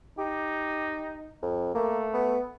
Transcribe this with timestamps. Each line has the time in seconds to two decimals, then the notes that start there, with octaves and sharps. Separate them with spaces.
0.18 D#4 G4
1.43 F2
1.75 A3 A#3
2.14 B3